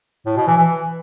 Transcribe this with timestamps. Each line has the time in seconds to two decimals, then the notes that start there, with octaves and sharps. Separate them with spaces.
0.26 A2
0.37 B2
0.47 E3
0.57 E3